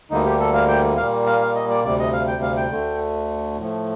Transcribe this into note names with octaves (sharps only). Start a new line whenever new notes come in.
D2 D3 G3 A#3 D#4
G4
A4
F5
G5
A#2 G3 A#3 F5
F5
F5
D#5
D5
D2 C3 G3 D5
D#5
F5
G5
F5
G5
D2 D3 A3
A2 F3 A3